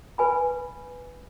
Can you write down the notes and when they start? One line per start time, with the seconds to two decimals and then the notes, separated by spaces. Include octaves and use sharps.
0.18 B4 G#5 B5